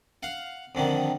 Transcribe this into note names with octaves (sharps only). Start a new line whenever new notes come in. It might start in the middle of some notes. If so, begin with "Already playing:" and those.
F5 F#5
F2 D3 D#3